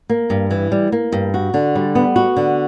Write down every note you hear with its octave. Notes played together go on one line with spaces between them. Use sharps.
A#3
G2
E3
G3
A#3
G2
F#4
D3
G3
B3
F#4
D3